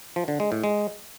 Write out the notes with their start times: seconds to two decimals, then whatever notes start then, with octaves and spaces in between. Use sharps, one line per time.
0.16 F3
0.28 D3
0.40 G#3
0.52 A2
0.64 G#3